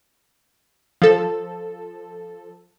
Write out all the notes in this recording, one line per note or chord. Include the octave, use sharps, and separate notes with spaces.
F3 A4